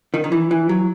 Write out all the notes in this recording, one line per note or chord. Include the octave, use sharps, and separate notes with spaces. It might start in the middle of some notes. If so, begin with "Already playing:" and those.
D#3
D#3
E3
E3
F#3